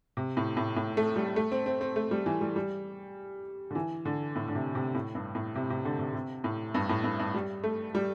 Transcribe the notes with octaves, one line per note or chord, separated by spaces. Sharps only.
C3
A2
A2
A2
A3
G3
A3
C4
C4
C4
A3
G3
E3
G3
G3
D3
E3
D3
A2
D3
C3
C3
A2
G2
A2
C3
C3
D3
C3
C3
A2
G2
A2
G2
G2
G3
A3
G3